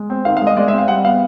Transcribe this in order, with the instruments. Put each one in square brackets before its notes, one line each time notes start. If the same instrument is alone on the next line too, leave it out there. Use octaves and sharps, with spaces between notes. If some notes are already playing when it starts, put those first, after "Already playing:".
Already playing: [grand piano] G#3
C4
D#3 F5
F5
G#3
D#5
G#3 D5
E5
C4
F5
G3 F#5
B3 F5